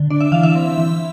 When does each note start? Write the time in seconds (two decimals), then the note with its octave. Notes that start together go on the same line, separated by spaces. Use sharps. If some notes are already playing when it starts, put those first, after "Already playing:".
Already playing: D3
0.10 D4 D5
0.21 E5
0.32 E3 F5
0.43 E5
0.55 C4
0.78 E3